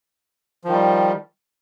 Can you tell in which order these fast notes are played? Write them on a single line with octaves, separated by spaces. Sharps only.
F3 D#3 G3